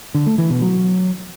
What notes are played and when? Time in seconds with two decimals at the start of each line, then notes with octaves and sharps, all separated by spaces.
0.14 D3
0.26 A3
0.38 E3
0.50 B2
0.62 F#3